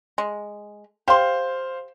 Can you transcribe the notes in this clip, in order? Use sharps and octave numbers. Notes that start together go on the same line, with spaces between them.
G#3
G4 C5 F5 C6